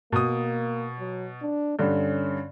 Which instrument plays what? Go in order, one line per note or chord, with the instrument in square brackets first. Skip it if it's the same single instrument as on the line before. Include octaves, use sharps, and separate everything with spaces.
[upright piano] B2 D#6 [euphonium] A#3
[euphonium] F#3
D4
[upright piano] G2 D3 [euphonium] C#4